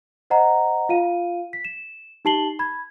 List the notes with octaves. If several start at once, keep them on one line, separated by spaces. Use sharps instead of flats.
C5 D#5 F#5 A#5
F4 F5 D#7
B6
E7
D#4 G4 A5 C7 F#7 G7
B5 G#6